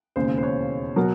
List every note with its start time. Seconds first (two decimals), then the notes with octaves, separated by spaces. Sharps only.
0.16 E1 D#2 C#3 C5
0.38 C5
0.43 C#5
0.96 B2 F#3 A#4